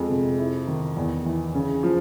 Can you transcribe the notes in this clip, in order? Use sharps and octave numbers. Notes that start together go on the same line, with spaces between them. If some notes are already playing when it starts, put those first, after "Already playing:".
Already playing: F2 G#3
C3
E4
D#3
E2
E3
C#3
F3